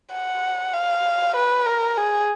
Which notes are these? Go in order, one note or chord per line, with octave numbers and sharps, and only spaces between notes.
F#5
F5
B4
A#4
G#4